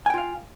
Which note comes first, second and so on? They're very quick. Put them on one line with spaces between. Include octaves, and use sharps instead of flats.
G#5 G5 F4 F5